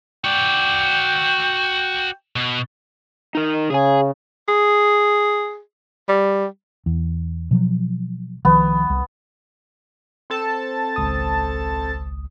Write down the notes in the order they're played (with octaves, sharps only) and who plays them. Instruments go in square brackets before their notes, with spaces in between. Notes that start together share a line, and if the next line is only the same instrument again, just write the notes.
[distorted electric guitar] F#4 D5 [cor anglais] G5
[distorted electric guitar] B2
[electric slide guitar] D#4 A#4
[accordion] C#3 [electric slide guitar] G#4 G#5
[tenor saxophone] G#4
G3
[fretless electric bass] E2
B2 F3 F#3
[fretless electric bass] C2 D#3 F3 [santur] B3
[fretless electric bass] C2
[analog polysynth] C4 A4 A5
[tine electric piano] G#1 C#2 D#6